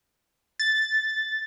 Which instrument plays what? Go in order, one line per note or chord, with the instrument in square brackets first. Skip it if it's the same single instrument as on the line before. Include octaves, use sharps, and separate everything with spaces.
[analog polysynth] A6